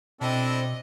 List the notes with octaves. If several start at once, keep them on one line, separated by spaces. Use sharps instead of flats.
B2 C4 D4 E4 A4 D#5